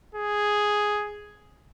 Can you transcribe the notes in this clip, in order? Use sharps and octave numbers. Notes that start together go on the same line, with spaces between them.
G#4